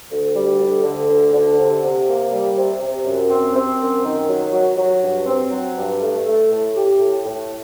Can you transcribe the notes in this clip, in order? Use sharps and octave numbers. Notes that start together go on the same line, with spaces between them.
D2
G3
D2
D3
D2
D3
C3
C3
A#3
G3
C3
C3
F#2
C4
C4
F#2
D#3
F#3
F#3
F#3
G2
C4
F#3
G2
A3
A3
A2
G4
A2
A2